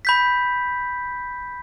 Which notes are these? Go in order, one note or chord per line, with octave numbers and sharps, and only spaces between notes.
B5 G6 B6